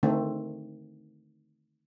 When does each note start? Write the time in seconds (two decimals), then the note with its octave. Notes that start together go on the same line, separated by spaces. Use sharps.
0.03 D3 D#3 A3 C4